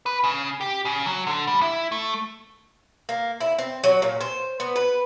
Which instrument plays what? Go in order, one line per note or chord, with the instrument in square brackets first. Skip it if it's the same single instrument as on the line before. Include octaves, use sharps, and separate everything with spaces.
[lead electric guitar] B4
C#3
G4
C#3
F#3
D3
G3
E4
A3
[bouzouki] A#3
E4
C4
F#3
A#2
C5
B3
B4